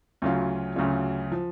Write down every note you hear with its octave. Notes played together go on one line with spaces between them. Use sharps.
D2 C#3 F#3 C#4 F4
D2 C#3 F#3 C#4 F4
F3